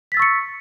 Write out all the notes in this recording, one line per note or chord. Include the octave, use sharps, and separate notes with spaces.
C#6 E6 A6 B6 C#7